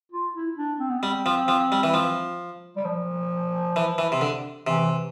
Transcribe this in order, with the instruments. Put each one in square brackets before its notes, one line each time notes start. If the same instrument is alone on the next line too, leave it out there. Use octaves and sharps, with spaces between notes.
[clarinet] F4
E4
D4
C4
B3
[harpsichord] G3 [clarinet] C4
[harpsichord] F3
F3
G3
E3
F3
[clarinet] G3
F3
[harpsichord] E3
E3
C3
D3
[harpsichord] C3 [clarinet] E3